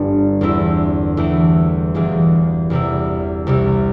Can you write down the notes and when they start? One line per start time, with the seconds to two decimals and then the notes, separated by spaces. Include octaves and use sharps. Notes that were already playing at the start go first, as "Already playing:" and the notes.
Already playing: G1 G2 D3 G3
0.41 E2 D3 C4 E4
1.17 E2 E3 A3 C4 E4
1.95 E1 E2 E3
2.70 E2 C3 G3 E4
3.47 C2 C3 G3